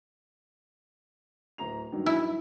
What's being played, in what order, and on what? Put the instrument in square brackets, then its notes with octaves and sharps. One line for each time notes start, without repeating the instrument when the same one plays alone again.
[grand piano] D1 A#5 F7
G2 D#3 F#3
[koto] E4